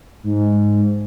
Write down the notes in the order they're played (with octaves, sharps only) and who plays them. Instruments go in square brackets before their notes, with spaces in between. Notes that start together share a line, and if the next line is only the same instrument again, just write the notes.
[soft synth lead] G#2